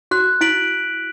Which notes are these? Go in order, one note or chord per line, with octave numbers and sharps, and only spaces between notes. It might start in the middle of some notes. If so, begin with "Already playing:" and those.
F#4 F#6
E4 B6 D7 F#7